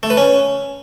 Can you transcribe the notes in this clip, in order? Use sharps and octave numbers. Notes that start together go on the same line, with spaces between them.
A3
B4
C#4